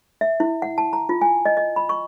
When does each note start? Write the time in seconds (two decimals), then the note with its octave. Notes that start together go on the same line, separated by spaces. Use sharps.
0.21 E5
0.40 E4
0.62 F#5
0.78 A5
0.93 A#5
1.09 F4
1.22 G#5
1.46 D#5
1.57 D#5
1.76 B5
1.89 C#6